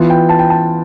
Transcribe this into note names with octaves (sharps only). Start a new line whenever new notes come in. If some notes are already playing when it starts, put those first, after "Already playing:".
Already playing: E3 B3 F4
G5
A5
G5
A5